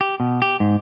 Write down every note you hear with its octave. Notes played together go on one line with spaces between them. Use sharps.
G4
B2
G4
G#2